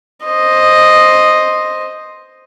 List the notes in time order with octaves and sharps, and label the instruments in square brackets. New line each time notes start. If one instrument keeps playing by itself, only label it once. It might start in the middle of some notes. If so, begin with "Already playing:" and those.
[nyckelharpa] C5 D#5